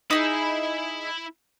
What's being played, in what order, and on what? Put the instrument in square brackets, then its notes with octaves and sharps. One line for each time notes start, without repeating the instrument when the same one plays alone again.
[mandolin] D#4 G4 G#4 [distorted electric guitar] E4 B5